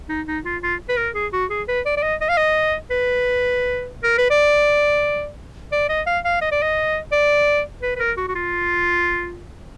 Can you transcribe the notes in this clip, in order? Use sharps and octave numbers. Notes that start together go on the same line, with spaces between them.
D#4
D#4
F4
F4
B4
A#4
G#4
F#4
G#4
B4
D5
D5
D#5
D#5
F5
D#5
B4
A#4
B4
D5
D5
D#5
F5
F5
D#5
D5
D#5
D5
B4
B4
A#4
F#4
F#4
F4